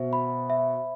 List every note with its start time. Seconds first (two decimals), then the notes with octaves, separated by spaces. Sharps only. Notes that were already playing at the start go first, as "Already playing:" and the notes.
Already playing: B2 C5 E5
0.13 B5
0.50 E5